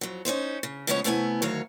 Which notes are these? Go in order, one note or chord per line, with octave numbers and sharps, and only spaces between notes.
F2 F#3
C#4 D#4 E4 C5
C#3
C#3 F3 G#3 B3 G#4 C#5
C3 A3 B3 E4 G5 G#5
D2 D#3 F#3 C#5 F5